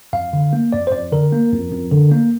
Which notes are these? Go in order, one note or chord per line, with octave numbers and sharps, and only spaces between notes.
F2 F5
D3
A#3
F2 D5
C5
F2 D5
D3 A#4
A#3
F2
F2
D3
A#3